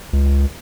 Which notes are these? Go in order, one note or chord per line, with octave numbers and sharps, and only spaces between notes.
C#2